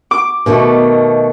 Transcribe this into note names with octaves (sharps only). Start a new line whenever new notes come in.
D6
B2 D#3 A3